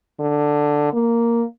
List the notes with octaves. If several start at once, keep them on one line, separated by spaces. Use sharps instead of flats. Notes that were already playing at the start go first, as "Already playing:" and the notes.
D3
A#3